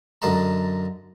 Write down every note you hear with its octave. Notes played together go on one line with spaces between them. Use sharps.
F#2 D3 D#5 F5 A5 A#5